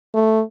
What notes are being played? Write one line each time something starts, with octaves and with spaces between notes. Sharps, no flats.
A3